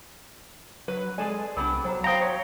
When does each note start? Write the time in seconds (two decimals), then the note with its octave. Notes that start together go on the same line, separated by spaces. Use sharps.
0.88 F#3 B4
1.18 G#3 G#4 A4 D5 G#5 A5
1.57 C2 G3 B3 D4 A#4
1.85 F#3 C5 F#5 A#5
2.04 C5 F5 G5 A#5 D#6
2.22 C#5